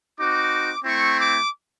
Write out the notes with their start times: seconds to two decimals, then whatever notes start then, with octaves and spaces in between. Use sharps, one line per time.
0.19 C4 D#4 F#4 D6
0.85 A3 C4 E4 C#6
1.19 D6